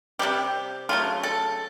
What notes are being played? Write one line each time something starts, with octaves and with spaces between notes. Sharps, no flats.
C3 D#3 G3 G4
C#3 F#3 A3 F4
A4